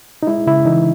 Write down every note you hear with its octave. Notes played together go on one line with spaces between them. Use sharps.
D#4
G#3 E4
C#3 E4
E3 D#4